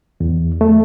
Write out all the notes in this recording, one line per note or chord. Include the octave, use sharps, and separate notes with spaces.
E2
A3